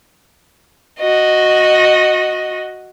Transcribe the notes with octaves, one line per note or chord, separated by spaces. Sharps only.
F#4 D#5